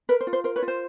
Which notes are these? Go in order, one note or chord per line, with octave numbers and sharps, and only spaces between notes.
A#4 B4
C5
F4
C5
A#4 C5
B4 C#5
F4
C5